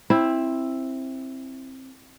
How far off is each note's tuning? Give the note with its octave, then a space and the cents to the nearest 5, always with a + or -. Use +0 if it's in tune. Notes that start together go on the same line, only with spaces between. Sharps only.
C4 +15 E4 +0